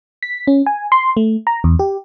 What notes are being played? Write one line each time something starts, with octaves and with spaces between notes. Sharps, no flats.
B6
C#4
G#5
C6
A3
A#5
E2
G4